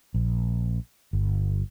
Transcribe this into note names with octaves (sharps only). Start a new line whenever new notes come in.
A#1
G1